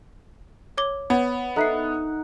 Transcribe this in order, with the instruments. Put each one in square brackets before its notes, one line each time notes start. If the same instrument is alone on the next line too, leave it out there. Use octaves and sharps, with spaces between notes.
[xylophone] C#5 D6 G7
[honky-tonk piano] B3 [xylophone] C#5
[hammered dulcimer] D#4 F#5 [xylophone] A4 E5 C7